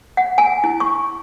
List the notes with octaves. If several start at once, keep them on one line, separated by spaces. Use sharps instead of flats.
F#5
G#5
E4
C#6